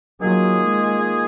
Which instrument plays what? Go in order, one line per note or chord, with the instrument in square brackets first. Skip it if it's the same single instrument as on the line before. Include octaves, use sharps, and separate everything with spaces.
[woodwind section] D#3 A#3 F4 G#4 [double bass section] F#3
[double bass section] G#3